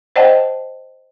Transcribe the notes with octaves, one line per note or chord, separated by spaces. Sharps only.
C5 D5 D#5 F#5 G5 A5